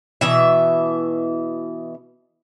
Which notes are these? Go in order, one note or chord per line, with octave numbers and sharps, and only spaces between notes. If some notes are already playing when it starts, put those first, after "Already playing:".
B2 E3 E5